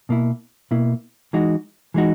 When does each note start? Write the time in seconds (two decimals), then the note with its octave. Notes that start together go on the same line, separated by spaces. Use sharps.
0.09 B2 A#3 E4
0.71 B2 A#3 E4
1.33 E3 G#3 D#4 F#4
1.94 E3 G#3 D#4 F#4